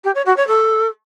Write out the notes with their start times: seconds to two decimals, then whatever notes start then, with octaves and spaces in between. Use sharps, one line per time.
0.04 G4
0.15 C#5
0.26 F#4
0.37 C#5
0.48 A4